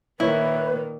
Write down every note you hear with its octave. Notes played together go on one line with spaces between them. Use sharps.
A#2 D#3 A#3 E4 B4 C#5 E5